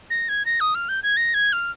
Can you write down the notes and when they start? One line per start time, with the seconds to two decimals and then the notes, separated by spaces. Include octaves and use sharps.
0.10 A#6
0.29 G#6
0.46 A#6
0.60 D#6
0.75 F6
0.89 G6
1.03 G#6
1.17 A#6
1.34 G#6
1.53 F6